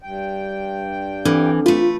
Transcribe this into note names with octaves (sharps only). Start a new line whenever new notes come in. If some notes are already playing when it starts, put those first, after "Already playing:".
G2 G5
E3 C4 D4 A4
A3 F4 B4